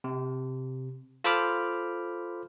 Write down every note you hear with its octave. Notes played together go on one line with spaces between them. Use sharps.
C3
F4 A4 C5 B5 D6 F6